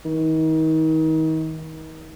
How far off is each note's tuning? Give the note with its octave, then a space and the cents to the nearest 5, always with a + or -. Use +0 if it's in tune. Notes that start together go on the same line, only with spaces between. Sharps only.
D#3 +35